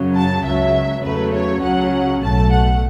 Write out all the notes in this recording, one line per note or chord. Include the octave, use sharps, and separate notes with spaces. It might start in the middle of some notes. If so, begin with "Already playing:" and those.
Already playing: F#2 C#3 F#3
A5
C#2 C#3 F#3 E5
E2 C#3 F#3 A3 B4
C#5
C#2 C#3 F#3 C#4 F#5
B1 A2 A3 A5
F#5